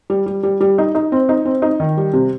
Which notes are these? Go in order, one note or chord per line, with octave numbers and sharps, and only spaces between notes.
G3
G3
G3
G3
D#4
D#4
C4
D#4
C4
D#4
D#3
G3
C3